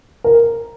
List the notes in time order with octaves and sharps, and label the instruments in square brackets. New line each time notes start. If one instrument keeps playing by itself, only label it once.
[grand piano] A#4